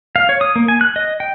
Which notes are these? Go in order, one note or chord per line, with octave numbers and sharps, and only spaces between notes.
F5
C#5
D#6
A#3
G#5
F#6
D#5
G5